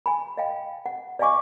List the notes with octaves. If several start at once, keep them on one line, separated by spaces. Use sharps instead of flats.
G#5 B5
D#5 F5 G5
F#5
D5 D#5 F5 G#5 C#6 D6